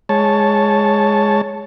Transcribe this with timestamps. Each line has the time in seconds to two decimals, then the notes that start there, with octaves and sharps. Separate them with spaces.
0.09 G#3 C#5 A5